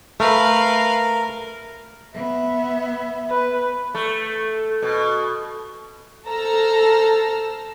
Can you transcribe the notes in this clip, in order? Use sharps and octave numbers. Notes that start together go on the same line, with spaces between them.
A3 A#4 B4 F5
B3 E5
B4
A3
B2
A4 C5 A5 A#5 E6 F6